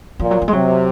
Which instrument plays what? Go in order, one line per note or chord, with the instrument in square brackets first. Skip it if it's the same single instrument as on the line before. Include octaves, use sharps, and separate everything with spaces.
[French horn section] A#2 [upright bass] F3
[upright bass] F#3
F3
G#3
[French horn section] C3 [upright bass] F#3